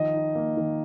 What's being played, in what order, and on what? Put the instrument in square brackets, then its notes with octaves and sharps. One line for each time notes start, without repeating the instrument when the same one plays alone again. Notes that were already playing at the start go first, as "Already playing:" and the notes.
Already playing: [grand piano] D#3 F3 D#5
D#4
A#3
D#3